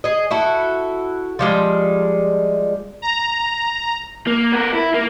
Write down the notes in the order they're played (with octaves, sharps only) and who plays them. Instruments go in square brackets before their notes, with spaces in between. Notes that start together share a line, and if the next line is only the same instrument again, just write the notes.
[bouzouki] G#4 D#5
E4 F#4 A4
F3 G3 G#3
[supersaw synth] A#5
[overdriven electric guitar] A#3
B3 A#4
E4
A#3